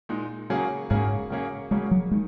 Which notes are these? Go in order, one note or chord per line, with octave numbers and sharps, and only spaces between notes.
A#2 G#3 D#4
C#3 F#3 A#3 C#4 G#4
G#2 C#3 F#3 A#3 C#4 G#4
C#3 F#3 A#3 C#4 G#4
C#3 F#3 G#3 A#3 C#4 G#4
F#3
D#3 G#3